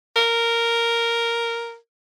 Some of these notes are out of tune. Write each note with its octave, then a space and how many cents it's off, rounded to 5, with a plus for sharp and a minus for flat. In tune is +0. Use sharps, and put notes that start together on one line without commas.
A#4 -5